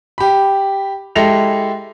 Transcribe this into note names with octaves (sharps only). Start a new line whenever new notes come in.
G4 B5
G#3 E4 G4 A4 A#6 F7